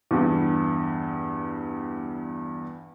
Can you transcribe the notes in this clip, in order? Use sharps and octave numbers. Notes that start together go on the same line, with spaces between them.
E2 G2